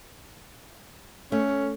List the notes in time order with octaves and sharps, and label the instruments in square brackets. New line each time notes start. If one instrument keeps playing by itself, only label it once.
[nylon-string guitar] A3 [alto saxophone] C#4